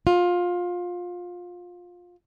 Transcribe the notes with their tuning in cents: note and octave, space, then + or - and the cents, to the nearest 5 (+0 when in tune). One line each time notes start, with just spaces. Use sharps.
F4 +20